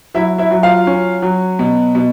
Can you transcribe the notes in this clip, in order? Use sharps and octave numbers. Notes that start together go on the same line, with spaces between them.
F#3 E4 E5
E4 E5
F#3
F4 F5
C#4
F#3
B2
B2